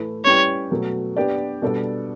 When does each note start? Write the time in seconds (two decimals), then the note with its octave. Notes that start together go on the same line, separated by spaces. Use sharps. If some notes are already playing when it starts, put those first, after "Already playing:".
Already playing: A2 E3 A3 E4 B4
0.24 G3 C#4 E4 G4 B4 C#5
0.71 B2 F#3 A3
1.17 B3 D4 G4 D5
1.62 B2 G3 D4 A4 D5